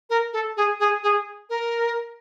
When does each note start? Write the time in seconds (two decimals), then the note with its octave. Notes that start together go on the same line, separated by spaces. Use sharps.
0.10 A#4
0.33 A4
0.57 G#4
0.80 G#4
1.03 G#4
1.50 A#4